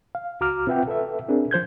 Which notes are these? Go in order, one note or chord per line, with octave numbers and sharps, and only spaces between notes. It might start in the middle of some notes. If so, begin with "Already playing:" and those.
F5
C#2 F#4 A#5 D6 F6
C4 F4 B4 E5 F#5 G5
A4 B4 E5
C4 D4 G#4 A#4
F3 C5 G6 G#6